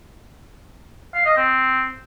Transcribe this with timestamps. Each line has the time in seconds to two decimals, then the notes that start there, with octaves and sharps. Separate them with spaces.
1.14 F5
1.25 D#5
1.37 C4